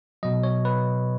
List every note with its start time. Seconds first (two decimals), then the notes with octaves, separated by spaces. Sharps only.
0.23 B2 F#3 D#5
0.43 C#5
0.65 B4